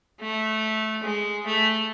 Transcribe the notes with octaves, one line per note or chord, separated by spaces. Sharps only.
A3
G#3
A3